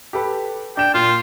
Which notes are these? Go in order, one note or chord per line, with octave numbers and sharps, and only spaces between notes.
G4 A4 B4
D4 G5 E7
A#2 F4